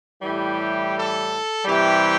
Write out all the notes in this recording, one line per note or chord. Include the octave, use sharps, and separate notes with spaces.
A2 E3 G3 G4
A4
C3 E3 G3 G4